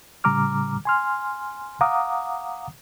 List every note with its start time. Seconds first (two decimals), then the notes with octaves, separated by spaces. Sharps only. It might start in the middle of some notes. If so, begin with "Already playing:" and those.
0.24 A2 C#3 G3 A#5 D6 F6
0.85 G#5 C6 F6
1.81 F5 F#5 A#5 D6 D#6